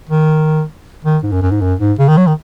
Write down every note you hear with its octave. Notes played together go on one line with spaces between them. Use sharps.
D#3
D#3
G#2
F#2
F#2
G#2
F#2
G#2
C#3
D#3
F#3
D#3